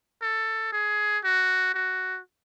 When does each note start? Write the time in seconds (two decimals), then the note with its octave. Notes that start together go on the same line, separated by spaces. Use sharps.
0.22 A4
0.73 G#4
1.24 F#4
1.74 F#4